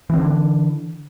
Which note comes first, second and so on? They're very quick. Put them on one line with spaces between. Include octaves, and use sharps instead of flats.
E3 C4 D3 D4